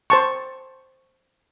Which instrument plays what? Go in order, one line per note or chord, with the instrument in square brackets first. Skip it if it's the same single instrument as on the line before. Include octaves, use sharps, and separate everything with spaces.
[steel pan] C5 A5 C#6